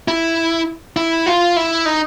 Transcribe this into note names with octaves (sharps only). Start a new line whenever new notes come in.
E4
E4
F4
E4
D#4